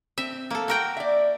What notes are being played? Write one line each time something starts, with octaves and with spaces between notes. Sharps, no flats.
C4 E5
A#3 A4
F#4 A#4 G5
D5 E5